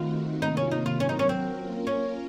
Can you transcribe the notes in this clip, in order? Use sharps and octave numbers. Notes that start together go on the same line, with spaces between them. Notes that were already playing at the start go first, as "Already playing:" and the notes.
Already playing: D#3 A3 C4 D#4 F4 F#4
C3 D#3 A#3 D#4 F4
C#4
D#4
F4
F#3 C4 C#4 F#4 A#4
D#4
C#4
C4
A#3 C#4 F4 A#4
C#4